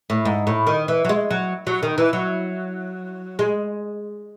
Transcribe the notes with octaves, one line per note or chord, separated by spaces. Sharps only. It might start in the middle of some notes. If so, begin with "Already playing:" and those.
A2
G#2
A2
D#3
E3
F#3
G#3
F#3
F#3
D#3
E3
F#3
G#3